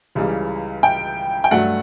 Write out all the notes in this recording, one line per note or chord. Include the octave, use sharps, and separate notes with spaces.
C#2 C#3 E3 G3
G5
G5
G2 F#3 A3 F#5